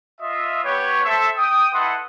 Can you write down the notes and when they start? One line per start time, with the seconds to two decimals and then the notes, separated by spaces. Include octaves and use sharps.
0.21 F4 D#5 E5
0.64 B3 G4 B4 C#5
1.04 A4 C5 E5
1.36 G5 D#6
1.73 E4 A4 B4 D#5 F#5 C6